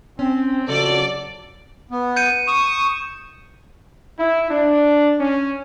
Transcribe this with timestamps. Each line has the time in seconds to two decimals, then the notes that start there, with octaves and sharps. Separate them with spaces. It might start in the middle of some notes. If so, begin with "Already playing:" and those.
0.19 C4 C#4
0.68 A#1 C#3 F#3 A4 D5 D#5
1.91 B3
2.16 G6 C#7 D#7
2.48 C#6 D#6 E7
4.18 E4
4.50 D4
5.20 C#4